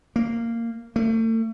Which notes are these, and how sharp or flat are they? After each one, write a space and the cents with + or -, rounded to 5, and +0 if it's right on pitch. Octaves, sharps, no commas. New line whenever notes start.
A#3 -15
A3 +40